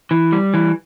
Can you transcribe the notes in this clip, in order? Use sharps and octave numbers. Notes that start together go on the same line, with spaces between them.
E3
G3
E3